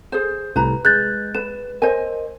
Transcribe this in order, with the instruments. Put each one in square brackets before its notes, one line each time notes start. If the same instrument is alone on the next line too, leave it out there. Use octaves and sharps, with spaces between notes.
[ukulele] G#4 C5
[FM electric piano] C2 A2 C3 [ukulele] B4 A#5
[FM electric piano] G#3 [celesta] F#6 G6 A6
[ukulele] B4 [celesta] E7
[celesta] A#4 [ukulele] C5 D#5 G#5